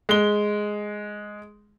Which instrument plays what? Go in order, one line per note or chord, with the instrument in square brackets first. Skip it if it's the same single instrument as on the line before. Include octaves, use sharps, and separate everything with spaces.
[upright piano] G#3 G7